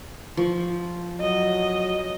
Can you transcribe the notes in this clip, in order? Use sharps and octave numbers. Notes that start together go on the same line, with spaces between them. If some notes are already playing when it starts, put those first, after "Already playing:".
F3
F#3 D#5